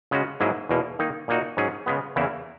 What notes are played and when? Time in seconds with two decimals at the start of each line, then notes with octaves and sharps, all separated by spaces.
0.11 C#3 G#3 C#4 F#4
0.40 G#2 F#3 A#3 E4 G#4
0.69 E2 B2 A#3
0.99 D#3 A#3 D#4
1.28 A#2 A#3 D#4 F#4
1.57 G#2 F#3 C#4 G#4
1.86 C#3 G#3 B3
2.16 E2 C#3 E3 A#3 E4